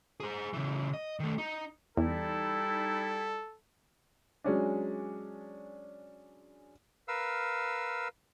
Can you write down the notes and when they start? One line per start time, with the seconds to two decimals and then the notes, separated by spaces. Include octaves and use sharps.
0.20 G#4 C5
0.53 C#3 E3
0.93 D#5
1.20 D#3 A3
1.38 D#4
1.97 E2 G3 D#4 E4 A4
4.44 F#3 G#3 C#4 D4
7.08 A#4 B4 F5 E6